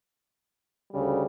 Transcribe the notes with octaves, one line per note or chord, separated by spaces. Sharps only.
D2 C#3 G3